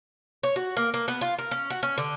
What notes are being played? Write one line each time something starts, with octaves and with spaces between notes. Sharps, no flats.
C#5
F#4
A#3
A#3
B3
F4
A#4
C#4
F#4
C#4
D3